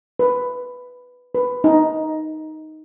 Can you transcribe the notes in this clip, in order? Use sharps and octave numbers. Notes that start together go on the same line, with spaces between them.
B4
B4
D#4